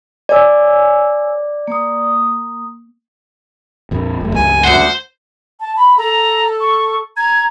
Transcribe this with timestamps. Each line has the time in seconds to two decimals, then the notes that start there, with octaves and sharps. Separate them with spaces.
0.29 C#5 D5 G#5 E6
1.68 A#3 D#6
3.91 A#1 F2
4.21 F#1 A3
4.35 C#2 G2 G#5
4.64 D2 C5 F#5
5.60 A5
5.76 B5
5.98 A4 A#5
6.60 C#6
7.17 A#5 G#6